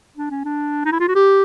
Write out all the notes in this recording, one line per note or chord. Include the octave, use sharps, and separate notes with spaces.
D4
C#4
D4
D#4
E4
F4
F#4
G4